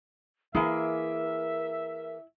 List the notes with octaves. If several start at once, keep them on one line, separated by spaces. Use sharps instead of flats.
E3 A#3 E4 G#4 A#4 E5